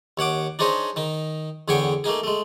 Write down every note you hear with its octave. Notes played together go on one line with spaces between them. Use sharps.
D#2 C#5 F#5 D6
D4 D#4 G#4 C5 C#5 D#5
D#3 D#4
E2 D3 G#4 C#5 G5 C#6
A3 A#3 D#4 G#4
G#3 A3